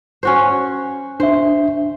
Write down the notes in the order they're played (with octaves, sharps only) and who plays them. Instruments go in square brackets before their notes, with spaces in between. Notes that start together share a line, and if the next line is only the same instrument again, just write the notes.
[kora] C#4 F#4 C5
[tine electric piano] D4 E5 [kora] C5